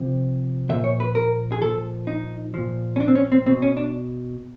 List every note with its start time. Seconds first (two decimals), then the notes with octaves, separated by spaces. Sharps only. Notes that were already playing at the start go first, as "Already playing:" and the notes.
Already playing: C3 F3
0.69 F3 E5
0.73 A#2
0.84 C#5
1.00 B4
1.15 A#4
1.52 G#4
1.61 A#2 F3 A4
2.07 D#4
2.54 A#2 F3
2.96 C#4
3.00 D4
3.08 C4
3.15 C#4
3.32 C4
3.46 B2 C4
3.62 C#4
3.77 D4